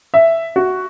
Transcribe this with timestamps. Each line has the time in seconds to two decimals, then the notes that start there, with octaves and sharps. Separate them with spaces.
0.14 E5
0.56 F#4